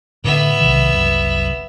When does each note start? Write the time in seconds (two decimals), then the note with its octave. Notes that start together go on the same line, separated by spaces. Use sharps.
0.24 A2 D3 B3 E5
0.60 B1 C3 D#3
0.93 F#1 C2 F#2